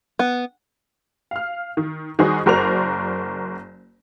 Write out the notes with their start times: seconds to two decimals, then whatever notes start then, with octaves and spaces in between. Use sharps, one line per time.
0.19 B3
1.31 F5 F6
1.77 D#3
2.19 D#3 G3 D#4 F#4 G#4 C5
2.46 F#1 F#4 A#4 C5 D5 F7